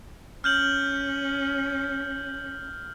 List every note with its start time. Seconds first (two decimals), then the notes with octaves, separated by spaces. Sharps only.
0.44 C#4 F6 G6 F#7